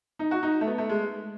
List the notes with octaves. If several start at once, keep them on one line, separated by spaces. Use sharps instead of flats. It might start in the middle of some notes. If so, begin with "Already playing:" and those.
D#4
F#4
D#4
A3
B3
A3
G#3